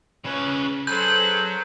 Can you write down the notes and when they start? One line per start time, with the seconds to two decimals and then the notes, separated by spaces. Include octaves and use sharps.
0.24 C#3 C#4 B4
0.87 F#3 G#4 A4 B4 C5 G6